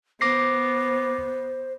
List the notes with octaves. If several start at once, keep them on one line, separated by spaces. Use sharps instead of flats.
B3 C5 D6 A#6 C7